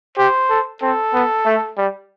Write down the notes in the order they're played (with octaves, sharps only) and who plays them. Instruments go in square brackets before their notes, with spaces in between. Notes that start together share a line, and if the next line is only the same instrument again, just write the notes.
[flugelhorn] G4 [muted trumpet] C5
[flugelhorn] A4
[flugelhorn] C4 [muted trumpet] A4
[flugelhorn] B3
A3
G3